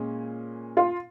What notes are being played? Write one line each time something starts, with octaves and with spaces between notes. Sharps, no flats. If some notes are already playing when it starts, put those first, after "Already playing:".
Already playing: A#2 G#3 C#4
F4